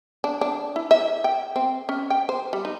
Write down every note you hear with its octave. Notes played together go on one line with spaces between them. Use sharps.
D4
D4
E4
E5
G5
C4
C#4
G5
C5
G3
D#4